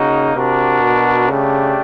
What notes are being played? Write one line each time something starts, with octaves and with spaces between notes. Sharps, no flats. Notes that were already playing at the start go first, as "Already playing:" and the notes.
Already playing: C#3 A#3 D#4 F#4
C3 D4 F#4 A#4
B2
C#3 A3 D4 G4